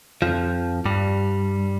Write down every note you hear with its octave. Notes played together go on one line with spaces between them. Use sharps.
F2 F3
G2 G3